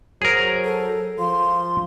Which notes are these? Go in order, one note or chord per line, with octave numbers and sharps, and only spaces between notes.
F#3 G#4 A#4 C5
A4
F3 F5 C6